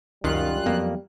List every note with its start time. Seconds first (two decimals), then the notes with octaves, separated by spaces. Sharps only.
0.24 C#2 F#2 D#3 G3 F4 F#6
0.66 F2 F#3 A#3 B3